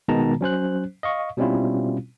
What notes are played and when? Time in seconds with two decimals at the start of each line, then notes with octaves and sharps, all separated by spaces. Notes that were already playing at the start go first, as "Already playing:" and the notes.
0.08 B2 D#3 G#3 B3 A5 A#5
0.41 F#3 C#4 C5 F#6
1.03 D#5 F5 C#6
1.37 B2 G3 C4 C#4 E4 F4